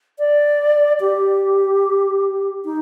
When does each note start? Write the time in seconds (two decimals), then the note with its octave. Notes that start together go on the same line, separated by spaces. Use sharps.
0.19 D5
1.00 G4
2.65 D#4